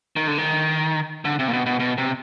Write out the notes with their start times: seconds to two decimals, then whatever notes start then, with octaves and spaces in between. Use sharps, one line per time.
0.16 D#3
0.28 D3
0.38 D#3
1.25 D3
1.39 C3
1.48 A#2
1.53 B2
1.66 B2
1.80 B2
1.98 C3